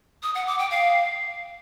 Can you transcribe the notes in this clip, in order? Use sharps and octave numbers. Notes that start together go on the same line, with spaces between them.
D#6
F#5
D6
G5
F5